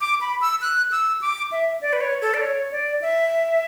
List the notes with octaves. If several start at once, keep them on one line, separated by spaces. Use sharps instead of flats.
D6
B5
E6
F#6
E6
D6
E5
D5
B4
C#5
A4
D5
C#5
D5
E5